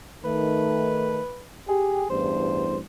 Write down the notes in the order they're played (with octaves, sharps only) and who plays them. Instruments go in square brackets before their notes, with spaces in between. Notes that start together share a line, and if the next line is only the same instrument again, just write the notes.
[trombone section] D#3 A3 [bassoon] B4
[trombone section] G4 [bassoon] G#4
[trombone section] A1 E2 G2 [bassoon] C5